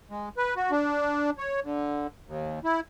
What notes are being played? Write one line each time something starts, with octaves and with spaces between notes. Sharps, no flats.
G#3
B4
F#4
D4
C#5
D3
D#2
E4